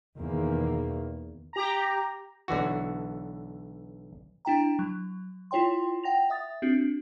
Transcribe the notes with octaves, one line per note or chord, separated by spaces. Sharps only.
E2 B2 D#3 A#3
G4 A#5
B1 D3 E3 F#4
D4 E4 G5 A#5
F#3
E4 F4 C#5 G5 C6
F#5 G5 A#6 F7
E5 D#6 A6
C4 D4 F#4